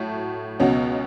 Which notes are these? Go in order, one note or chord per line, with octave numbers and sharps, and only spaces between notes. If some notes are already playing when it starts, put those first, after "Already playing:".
Already playing: A2 F#3 A3
C#2 B2 F#3 C#4